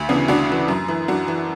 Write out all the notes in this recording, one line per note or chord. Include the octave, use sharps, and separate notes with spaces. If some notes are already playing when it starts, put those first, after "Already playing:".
Already playing: D2
C#3 E3 B3 D4
D2 D4 F#4
C#3 E3
F#2
E3
F#2 D4 F#4
E3